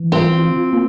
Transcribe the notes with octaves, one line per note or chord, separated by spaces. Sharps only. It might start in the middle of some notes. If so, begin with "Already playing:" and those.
Already playing: E3
C4 F4
F4
A#3